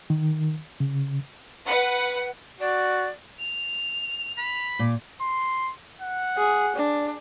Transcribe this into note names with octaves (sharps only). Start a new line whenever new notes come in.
D#3
C#3
B4 F#5
F#4 D5
F7
B5
A#2 D6
C6
F#5
G#4
D4